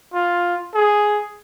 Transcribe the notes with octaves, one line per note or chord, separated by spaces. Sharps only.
F4
G#4